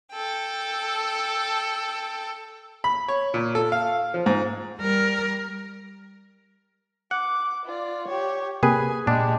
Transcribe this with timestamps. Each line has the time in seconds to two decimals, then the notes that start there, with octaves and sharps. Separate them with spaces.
0.12 A4 G5
2.84 B5
3.08 C#5
3.34 A#2
3.55 A4
3.72 F5
4.14 F3
4.26 G#2
4.78 G3 A#4
7.11 F#5 D6
7.65 F4 D5
8.07 G4 C#5
8.63 C3 A#3 G4 G#4 B4 G#5
9.07 A#2 G#3 D4 G4